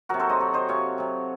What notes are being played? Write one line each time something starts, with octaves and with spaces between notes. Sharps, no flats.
C3 F#3 F#4 A#4
A4 C5
C5 D#5
C3 F#3
C5 D#5
C3 F#3 C#5 F5
C3 F#3